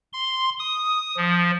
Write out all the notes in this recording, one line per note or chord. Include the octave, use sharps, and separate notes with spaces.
C6
D#6
F3